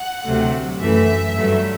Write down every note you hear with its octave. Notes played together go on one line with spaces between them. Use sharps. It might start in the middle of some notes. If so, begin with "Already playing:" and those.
Already playing: F#5
D2 C3 F#3 A3
F#2 E3 A3 E5
G2 F#3 A3